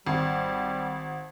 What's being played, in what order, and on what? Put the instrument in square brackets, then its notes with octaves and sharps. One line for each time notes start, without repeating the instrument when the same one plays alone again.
[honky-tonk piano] G#1 [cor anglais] G3